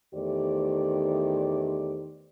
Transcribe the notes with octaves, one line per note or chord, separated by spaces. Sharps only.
E2 D#3 A3 G4 C5 D5